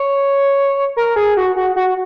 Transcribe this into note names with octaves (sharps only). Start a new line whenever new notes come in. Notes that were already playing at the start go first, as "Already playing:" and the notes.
Already playing: C#5
A#4
G#4
F#4
F#4
F#4